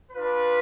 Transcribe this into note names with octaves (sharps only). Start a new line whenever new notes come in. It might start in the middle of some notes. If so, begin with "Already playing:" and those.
D4 F4 B4